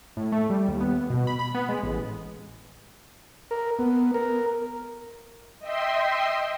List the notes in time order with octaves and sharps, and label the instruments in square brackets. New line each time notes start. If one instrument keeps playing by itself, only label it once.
[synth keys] A2
A3
G3
D#2
B3
B2
B5
B5
B3
G#3
A1
[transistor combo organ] A#4
B3
A#4
[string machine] D#5 E5 G5 C6